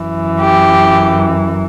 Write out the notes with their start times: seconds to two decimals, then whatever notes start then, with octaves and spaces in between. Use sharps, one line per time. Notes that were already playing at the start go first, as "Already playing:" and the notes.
Already playing: F#2 E3
0.40 G4